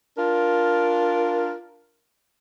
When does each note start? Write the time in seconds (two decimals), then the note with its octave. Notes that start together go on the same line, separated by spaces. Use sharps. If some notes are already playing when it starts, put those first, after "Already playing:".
0.18 D4 F4 A#4